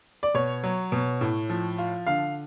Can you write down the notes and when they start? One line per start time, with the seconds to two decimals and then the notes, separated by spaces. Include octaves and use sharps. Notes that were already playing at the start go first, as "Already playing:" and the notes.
0.23 D5
0.34 B2 C#5
0.64 F#3
0.92 B2
1.21 A2
1.50 F3
1.78 F4
2.07 D3 F5